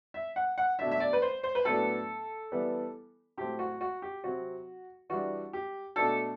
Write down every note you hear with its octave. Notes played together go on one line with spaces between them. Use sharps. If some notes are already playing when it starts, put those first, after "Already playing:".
E5
F#5
F#5
B2 F#3 A3 D4 E5
E5
D5
B4
C5
C5
B4
A2 F#3 B3 D4 A4
E3 G3 B3
A2 F#3 C4 G4
F#4
F#4
G4
C3 F#3 C4 F#4
E3 G3 D4 F#4
G4
B2 A3 D4 A4